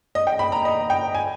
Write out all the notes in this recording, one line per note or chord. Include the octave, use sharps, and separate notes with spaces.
D#5
G5
B5
A#5
D#5
G5
G#5